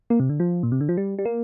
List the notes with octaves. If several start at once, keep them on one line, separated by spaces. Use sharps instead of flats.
A#3
C3
D3
F3
A#2
C3
D3
F3
G3
G3
A#3